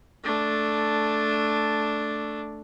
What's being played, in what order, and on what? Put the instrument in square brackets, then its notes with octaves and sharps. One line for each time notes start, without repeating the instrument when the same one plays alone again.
[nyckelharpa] A3 D4